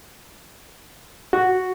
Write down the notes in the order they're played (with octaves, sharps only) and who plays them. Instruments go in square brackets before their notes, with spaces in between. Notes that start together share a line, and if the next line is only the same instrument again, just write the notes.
[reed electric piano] F#4